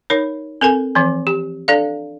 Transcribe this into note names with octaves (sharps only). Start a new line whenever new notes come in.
D#4 A#4 C#5
C4 A4 A#4 G#5
E3 F3 C4
G4
D4 A4 D5 F5